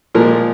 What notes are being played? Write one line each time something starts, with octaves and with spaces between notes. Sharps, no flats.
A#2 F3 G#3 A#4